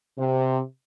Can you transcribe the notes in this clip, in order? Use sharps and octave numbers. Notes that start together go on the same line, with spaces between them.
C3